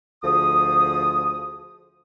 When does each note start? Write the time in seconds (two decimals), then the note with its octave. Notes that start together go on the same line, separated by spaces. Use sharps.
0.24 D2 F3 G#4 D#6